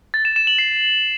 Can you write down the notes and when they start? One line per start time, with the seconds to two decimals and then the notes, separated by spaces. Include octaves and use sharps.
0.14 A6
0.25 E7
0.36 E7
0.47 F#7
0.58 C7